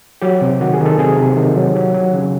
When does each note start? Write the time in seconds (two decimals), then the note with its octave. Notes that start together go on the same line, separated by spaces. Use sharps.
0.22 F#3 G4
0.42 C3
0.61 D#3 F#4
0.73 G#4
0.80 D#3
0.86 A4
0.99 C3 G#4
1.17 C3
1.37 D#3
1.56 F#3
1.76 F#3 G4
1.94 F#3
2.14 C#3